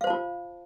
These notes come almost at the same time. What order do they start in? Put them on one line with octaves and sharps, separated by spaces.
F5 C5 A5 F4